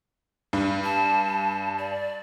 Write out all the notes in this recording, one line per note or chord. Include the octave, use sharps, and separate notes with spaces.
G2 D4
A5
D5